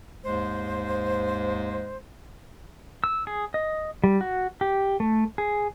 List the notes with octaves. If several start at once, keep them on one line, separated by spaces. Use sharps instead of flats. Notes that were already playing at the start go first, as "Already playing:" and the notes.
D#2 G#2 G#3 C5
E6
G#4
D#5
G3
F#4
G4
A3
G#4